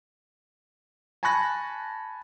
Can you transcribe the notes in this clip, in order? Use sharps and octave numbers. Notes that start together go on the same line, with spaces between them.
G#5 A5 B5 C#6 F#6 A#6